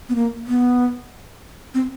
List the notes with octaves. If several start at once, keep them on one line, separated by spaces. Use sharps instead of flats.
B3
A#3
B3
C4